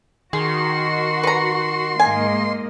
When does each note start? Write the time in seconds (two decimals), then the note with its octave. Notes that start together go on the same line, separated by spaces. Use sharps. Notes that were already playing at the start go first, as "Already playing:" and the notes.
0.33 D#3 F#4 G#4 C6
1.23 B4 A#5
2.00 G#2 A#3 D#5 G#5